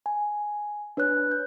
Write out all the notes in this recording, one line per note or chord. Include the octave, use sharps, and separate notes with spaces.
G#5
D4 B4 C#5 F#6
G6